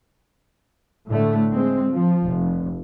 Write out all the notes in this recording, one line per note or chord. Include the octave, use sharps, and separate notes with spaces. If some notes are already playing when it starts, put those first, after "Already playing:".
A2 D3 A3
G#3 C4
F3
F1